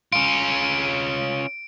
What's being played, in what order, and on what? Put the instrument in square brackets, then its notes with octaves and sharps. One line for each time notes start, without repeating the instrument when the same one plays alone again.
[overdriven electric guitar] C#4 F4 [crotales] D7